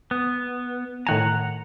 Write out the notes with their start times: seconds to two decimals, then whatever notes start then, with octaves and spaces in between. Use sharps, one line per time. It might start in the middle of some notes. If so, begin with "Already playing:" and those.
0.11 B3
1.07 A2 D#3 F#5 G#5 A#5